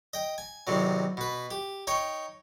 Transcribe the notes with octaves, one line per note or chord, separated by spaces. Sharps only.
D#5 G5
G#5
E2 C3 D#3 F#3
B2 B4
G4
D#4 C#5 G5